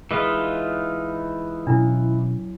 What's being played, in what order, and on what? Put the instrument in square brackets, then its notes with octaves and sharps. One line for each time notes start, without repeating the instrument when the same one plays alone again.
[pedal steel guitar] E3 D#4 F4 [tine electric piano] G#3 B4
[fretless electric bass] B2 C#4 [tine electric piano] F#3 [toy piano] D4 E4